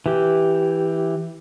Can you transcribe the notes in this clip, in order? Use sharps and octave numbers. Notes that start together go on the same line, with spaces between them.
E3 G4